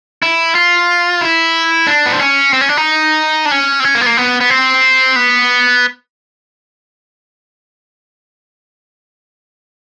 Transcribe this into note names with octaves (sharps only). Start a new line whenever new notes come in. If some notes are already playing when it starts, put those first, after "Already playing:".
E4
F4
E4
D4
B3
C4
C#4
C4
C#4
D4
D#4
D4
C#4
C4
C#4
A#3
B3
A#3
B3
B3
C4
B3